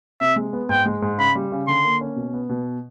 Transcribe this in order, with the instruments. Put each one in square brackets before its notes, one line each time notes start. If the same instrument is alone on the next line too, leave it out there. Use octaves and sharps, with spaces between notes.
[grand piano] C3 [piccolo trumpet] E5
[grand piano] G#3
B3
[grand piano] G#2 [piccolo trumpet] G5
[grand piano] G#3
G#2
[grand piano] C#3 [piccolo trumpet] B5
[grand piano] G3
C#3
[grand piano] D3 [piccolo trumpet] C6
[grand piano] A#3
C#4
B2
B3
B2